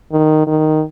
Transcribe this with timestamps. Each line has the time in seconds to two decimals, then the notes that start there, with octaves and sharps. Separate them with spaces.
0.12 D#3
0.47 D#3